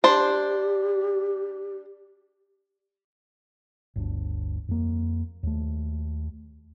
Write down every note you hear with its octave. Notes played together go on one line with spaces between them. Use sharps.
D4 G4 C5
G1 D2 D4
F2 A#3
D#2 A3